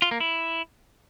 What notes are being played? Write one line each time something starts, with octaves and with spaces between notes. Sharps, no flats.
F4
A#3
E4